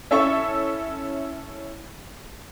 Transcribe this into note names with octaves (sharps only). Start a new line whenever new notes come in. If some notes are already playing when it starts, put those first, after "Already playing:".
C#4 E4 A4 E5 C#6